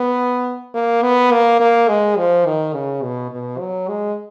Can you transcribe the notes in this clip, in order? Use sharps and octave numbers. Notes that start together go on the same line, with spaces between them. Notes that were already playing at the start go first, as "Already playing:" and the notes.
Already playing: B3
A#3
B3
A#3
A#3
G#3
F3
D#3
C#3
B2
B2
F#3
G#3